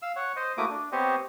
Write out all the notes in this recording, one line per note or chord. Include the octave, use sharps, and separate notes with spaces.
F5 E6
C#5 F#5
C5 D#5
A3 A#3 E4 F#4 D6 D#6
D4
B3 C4 G4 C5 C#5 D#5